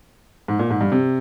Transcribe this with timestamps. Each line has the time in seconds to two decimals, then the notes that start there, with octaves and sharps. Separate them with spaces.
0.48 G#2
0.59 A#2
0.70 G#2
0.81 G2
0.92 C3